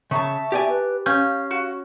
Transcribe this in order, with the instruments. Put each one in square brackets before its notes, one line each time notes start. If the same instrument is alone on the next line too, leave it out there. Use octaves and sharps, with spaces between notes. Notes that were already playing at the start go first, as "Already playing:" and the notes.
[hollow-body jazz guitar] C#3 [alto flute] E5 [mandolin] A5 A#5 C#6
[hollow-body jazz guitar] G4 D5 G#5
[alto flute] B4
[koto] C#4 [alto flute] F5 [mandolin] G6
[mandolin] F#4